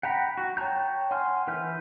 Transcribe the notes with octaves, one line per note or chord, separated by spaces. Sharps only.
F#5 G5 A#5 B5
F#4
C#5 G5 A5 A#5 G6
F#5 G#5 C6 F6
E3 B4 F6 G6